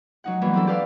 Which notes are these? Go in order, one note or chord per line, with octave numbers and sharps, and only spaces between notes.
F#3 D#4 F#5
E3 F#3 G3 A#3 B3
C4 D4 E4 A4
G4 A4 B4 D5 F5 A5